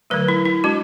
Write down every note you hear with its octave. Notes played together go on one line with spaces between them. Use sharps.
D3 F#3 A3 B4
E4
E4
G#3 D4 F#4